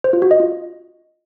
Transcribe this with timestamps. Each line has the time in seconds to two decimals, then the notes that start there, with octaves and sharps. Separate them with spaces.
0.04 C5
0.13 F4
0.22 F#4
0.31 D#5
0.40 F4